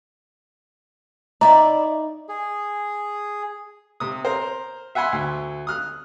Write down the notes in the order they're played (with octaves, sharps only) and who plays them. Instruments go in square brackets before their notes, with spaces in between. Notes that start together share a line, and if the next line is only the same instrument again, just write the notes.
[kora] D#4 [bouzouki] E4 D5 [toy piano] A#5
[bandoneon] G#4
[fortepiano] C3 D#6
A#4 C5
E5 F#5 G#5 B5 C6
D2
D#6 F6 F#6